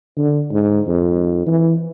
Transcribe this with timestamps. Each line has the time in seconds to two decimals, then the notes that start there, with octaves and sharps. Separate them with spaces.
0.18 D3
0.52 G#2
0.87 F2
1.46 E3